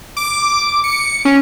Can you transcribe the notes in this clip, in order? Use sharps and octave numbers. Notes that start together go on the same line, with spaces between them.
D6
C#7
C#4